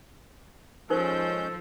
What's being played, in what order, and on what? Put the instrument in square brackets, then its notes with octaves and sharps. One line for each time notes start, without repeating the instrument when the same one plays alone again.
[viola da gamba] F3 [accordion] G#3 C#4 G6 [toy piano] D#4 A#4 C5 [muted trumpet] A4